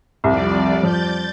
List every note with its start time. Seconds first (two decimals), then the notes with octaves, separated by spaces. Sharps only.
0.24 C2 F2 G3 D5
0.83 F3 G6 A6